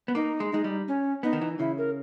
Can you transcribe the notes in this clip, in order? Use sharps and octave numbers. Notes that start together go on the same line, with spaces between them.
B3
A#3 D#4
G#3
G#3 D#4
G3
C#4
B3 D#4
D#3
E3
C#3 E4
A#4